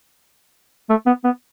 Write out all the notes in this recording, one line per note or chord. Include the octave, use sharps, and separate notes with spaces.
A3
B3
B3